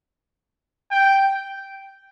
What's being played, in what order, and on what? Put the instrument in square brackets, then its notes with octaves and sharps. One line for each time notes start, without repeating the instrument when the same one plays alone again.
[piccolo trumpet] G5